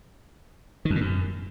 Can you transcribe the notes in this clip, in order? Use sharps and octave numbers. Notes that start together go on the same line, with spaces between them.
D#3
F2
A#2
F#2